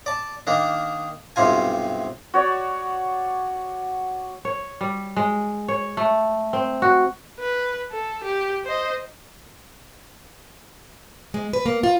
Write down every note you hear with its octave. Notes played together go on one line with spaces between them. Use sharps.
D5 A5
D#3 A#3 D4
B1 G2 C3 F4 G#5
F#4 C#5 D5
C#5
G3
G#3
C#5
A3
C4
F#4
B4
A4
G4
C5 D#5
G#3
B4
A#3
F4